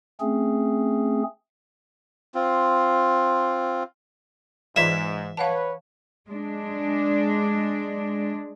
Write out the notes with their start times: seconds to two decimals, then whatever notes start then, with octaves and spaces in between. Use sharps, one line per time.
0.21 A3 C4 C#4 G#4
2.35 C4 F4
4.76 G#2 E3 F4 D5 E5
5.37 B4 C#5 F5 F#5 A5
6.29 G#3 D4